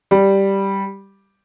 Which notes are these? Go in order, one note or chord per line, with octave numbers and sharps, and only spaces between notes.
G3